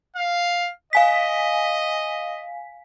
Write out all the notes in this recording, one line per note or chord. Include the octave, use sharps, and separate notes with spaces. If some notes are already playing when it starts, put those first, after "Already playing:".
F5
D#5 F5 G#5 B6